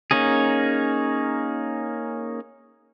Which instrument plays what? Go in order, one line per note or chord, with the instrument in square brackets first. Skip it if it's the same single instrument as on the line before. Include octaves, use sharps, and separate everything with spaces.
[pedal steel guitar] A#3 C#4 D#4 G#4